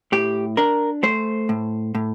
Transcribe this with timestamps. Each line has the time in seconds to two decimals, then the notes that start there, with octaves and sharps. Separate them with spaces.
0.12 A2 G4
0.57 D4 A#4
1.03 A3 C5
1.49 A2
1.95 A2